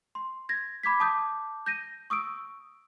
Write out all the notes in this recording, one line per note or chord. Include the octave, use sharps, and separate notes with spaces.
C6
G#6 A#6
B5 D6 G#6 B6
A5 D6 D#6 G6
G6 A#6 D#7
C#6 D#6 E6 D7